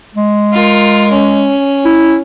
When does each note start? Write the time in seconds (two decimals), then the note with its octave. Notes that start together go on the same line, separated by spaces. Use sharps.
0.15 G#3
0.52 F4 A#4
1.11 C#4
1.85 E4